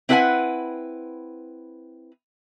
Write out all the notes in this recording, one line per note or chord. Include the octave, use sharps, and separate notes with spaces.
C4 E4 B4 D5 F#5 G#5